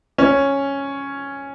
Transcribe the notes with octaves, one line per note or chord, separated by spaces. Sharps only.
C#4